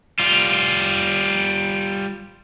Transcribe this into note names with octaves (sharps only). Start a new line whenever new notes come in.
G3 F4